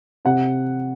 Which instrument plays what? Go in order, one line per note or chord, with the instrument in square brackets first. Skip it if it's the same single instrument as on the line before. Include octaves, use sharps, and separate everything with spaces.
[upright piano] C3 F#5